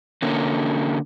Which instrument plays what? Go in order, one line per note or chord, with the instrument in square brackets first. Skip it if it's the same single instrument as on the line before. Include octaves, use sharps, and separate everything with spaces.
[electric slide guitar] D3 A#3 C#4